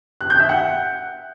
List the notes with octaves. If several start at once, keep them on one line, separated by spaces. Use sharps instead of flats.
F#6
G6
E5
F#5